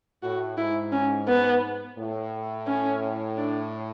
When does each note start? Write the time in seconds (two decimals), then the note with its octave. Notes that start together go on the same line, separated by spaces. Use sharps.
0.23 A2 F#4
0.58 G#2 E4
0.92 C#4
1.28 B3
1.98 A2
2.67 C#4
3.37 D4